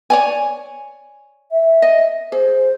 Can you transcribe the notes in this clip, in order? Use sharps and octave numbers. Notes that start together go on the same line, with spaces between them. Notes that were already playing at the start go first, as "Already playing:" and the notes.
C#5 D5 G#5
E5
D#5
G#4 C5